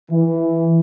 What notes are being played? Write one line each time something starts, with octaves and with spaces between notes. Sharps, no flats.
E3